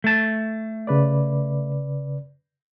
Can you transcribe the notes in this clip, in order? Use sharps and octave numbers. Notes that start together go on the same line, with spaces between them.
A3 A5
C#3 B4 D5